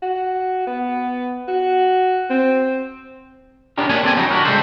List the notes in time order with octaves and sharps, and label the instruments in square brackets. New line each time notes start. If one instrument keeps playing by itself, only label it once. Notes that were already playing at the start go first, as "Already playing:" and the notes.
[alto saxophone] F#4
B3
F#4
C4
[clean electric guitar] B3 C#4 D4 G4 A#4
A#3 B3 C#4 D4 G4 G#5
C4 A4 D5 G#5
F2 D3 F#3 G3 D#4
D4 E4 F#4 A#4
C#3 F3 G#3 G4 A4 C5